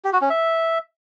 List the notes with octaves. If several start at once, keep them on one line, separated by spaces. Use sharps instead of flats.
G4
F#4
C#4
E5